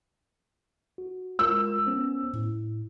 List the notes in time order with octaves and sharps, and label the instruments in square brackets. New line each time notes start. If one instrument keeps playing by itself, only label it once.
[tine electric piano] F#4
[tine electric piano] G#3 F4 A#4 [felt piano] E6
[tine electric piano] B3 C#4 C5
A2 E4